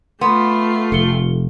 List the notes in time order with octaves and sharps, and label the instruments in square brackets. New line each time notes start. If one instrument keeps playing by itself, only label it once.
[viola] A3 F4 [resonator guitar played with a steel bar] B3 [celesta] B5 C6
[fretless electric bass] F1 [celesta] A4 C#7 G7